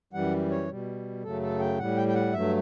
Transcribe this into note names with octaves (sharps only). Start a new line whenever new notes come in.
F#2 E3 G3 F#5
C#5
B2 G3
F#2 C#3 F#3 A3 A4
A4
G5
A2 G3 F#5
G5
G5
F#5
G2 F#3 A3 E5